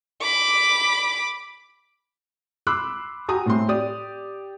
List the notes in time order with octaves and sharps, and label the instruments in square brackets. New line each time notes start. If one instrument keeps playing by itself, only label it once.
[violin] B5 D6
[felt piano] B5 C6 D6 E6 F#6
F#4 G4 G#5 A#5 D#6
A2 C4 C6
G4 D5 D#6